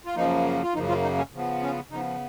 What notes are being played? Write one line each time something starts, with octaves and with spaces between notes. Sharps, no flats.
F4
F#2 C#3 F3 A#3 D#4
F4
F#2 C#3 F3 A#3 D#4
F3 F4
D#4
C#4
C#3 F3 B3
C#4
C#3 F3 B3 D#4